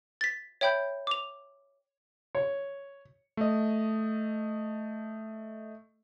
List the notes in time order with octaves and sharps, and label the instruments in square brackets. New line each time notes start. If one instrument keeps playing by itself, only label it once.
[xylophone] A6 B6
C#5 E5 G5 B5 G6
D6 F7
[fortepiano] C#5
[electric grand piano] A3 D#5